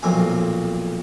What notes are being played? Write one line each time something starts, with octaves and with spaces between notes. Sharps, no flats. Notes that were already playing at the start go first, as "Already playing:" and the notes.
B1 F2 A#2 G#5